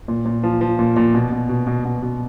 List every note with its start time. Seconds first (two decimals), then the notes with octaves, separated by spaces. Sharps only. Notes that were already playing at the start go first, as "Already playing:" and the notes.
0.08 A#2
0.25 A#2
0.43 F3
0.61 F3
0.79 A#2
0.96 A#2
1.14 B2
1.31 B2
1.49 B2
1.67 B2
1.85 B2
2.02 B2